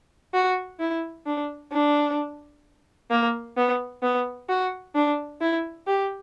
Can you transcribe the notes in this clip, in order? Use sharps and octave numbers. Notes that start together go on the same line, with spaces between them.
F#4
E4
D4
D4
A#3
B3
B3
F#4
D4
E4
G4